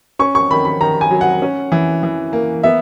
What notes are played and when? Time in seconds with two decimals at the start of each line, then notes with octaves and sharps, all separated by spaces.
0.19 C#4 C#6
0.35 C#6
0.51 D#3 B5
0.65 B5
0.81 D#3 A#5
1.01 G#5
1.11 F#3
1.21 F#5
1.42 C#4
1.72 E3
2.03 E3
2.33 A#3
2.63 B3 E5